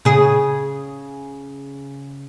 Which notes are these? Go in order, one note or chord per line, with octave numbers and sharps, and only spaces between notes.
C#3 G#4